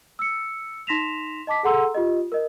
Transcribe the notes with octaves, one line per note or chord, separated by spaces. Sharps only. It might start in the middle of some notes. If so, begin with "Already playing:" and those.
E6 C#7
D#4 C6 A#6 B6 E7 F7
D#5 A5 D6 B6
G#4 A4 F#5 A#5 C6 E6
F4 G4 D#5
A#4 D#5